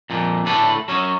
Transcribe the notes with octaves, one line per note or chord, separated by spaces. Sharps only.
F2 A#2
A2 D3 A4 B4
F#3 C#4